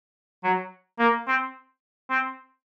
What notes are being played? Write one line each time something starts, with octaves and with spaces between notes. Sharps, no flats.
F#3
A#3
C4
C4